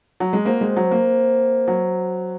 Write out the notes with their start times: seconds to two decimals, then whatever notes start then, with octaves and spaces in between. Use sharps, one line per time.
0.20 F#3
0.33 G#3
0.45 A#3 C4 F#4 C5
0.61 G#3
0.76 F#3
0.91 A#3
1.68 F#3